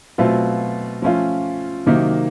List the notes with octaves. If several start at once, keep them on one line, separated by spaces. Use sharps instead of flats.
B2 F#3 A3 C4 F4
F3 A3 C#4 F4
C3 D#3 F#3 A#3 D#4